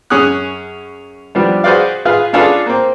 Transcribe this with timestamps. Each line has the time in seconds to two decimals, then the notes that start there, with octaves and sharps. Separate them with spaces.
0.10 F#2 C#4 G#4 D#6 F#6
1.35 F3 G3 B3 D4
1.64 F#4 G#4 B4 C5 D5 F5
2.05 F4 G#4 B4 F5
2.33 C#4 D4 F4 G#4 A4 B4
2.66 A#3 C4